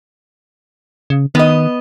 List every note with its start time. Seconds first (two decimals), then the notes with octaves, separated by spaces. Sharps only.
1.10 C#3
1.35 D#3 B3 D#5